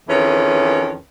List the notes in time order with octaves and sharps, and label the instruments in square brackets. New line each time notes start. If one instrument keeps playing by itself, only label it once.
[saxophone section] F2 D#3 E3 C#4 G#4 B4